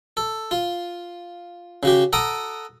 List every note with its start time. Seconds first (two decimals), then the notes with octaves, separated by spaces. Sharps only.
0.17 A4
0.51 F4
1.83 C#3 F#4 G4
2.13 A4 F#5 A#5 D6 D#6